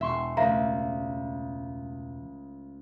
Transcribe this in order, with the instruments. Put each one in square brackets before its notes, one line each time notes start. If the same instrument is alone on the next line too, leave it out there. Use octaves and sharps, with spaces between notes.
[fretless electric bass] E1 [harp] E5 C6 C#6
[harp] C#2 A3 [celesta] E5 F5 A#5